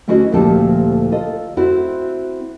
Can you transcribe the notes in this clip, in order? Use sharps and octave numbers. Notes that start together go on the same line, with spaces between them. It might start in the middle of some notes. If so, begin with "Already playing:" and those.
D2 C#4 E4 F#4 G#4 D#5
D2 A#2 F3 E4 G4 A4
F4 A4 D#5
C4 E4 F#4